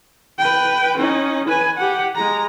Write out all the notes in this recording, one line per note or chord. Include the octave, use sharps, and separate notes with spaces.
B4 G5
C#4 D#4
B4 G#5
G4 F#5
G#3 A#5